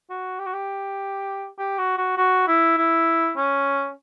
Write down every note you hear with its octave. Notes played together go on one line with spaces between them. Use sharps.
F#4
G4
F#4
G4
G4
F#4
F#4
F#4
E4
E4
C#4